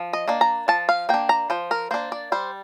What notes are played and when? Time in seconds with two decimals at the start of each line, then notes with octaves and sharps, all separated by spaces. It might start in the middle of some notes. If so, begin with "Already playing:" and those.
Already playing: F3
0.13 D#5
0.28 A#3 D4
0.41 A#5
0.68 F3 A5
0.89 F5
1.09 A#3 D4 G5
1.29 A#5
1.50 F3 C5
1.71 A#4
1.91 A#3 D4 C5
2.12 D5
2.32 G3 C5